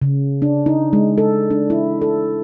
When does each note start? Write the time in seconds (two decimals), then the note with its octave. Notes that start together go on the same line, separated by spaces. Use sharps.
0.02 C#3
0.42 D4
0.66 D#4
0.93 G#3
1.18 A4
1.51 D4
1.70 E4
2.02 A4